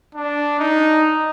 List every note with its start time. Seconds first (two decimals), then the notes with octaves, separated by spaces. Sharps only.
0.15 D4
0.59 D#4